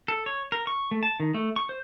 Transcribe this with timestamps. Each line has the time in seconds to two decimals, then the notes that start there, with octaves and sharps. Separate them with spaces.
0.08 A4
0.26 C#5
0.52 A#4
0.67 C#6
0.91 A3
1.03 A5
1.20 D#3
1.34 A3
1.56 C#6
1.69 C5